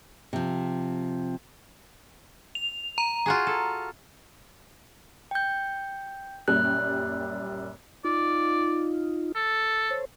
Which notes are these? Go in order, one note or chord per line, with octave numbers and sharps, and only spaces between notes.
C3 F3
F7
A#5
F4 F#4 G#4
A4
G5 G6
F#2 A#2 G3 F#6
D#4 F4 D5
A4
C5 C#5